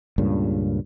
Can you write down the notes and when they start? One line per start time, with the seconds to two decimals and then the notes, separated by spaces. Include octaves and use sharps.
0.18 C#2 G2 A#2 C#3